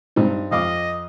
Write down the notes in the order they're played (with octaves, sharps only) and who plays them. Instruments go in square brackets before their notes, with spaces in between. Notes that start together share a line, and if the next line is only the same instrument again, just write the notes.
[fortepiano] G2 C4 D#4
[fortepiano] F2 F5 D6 [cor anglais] D#5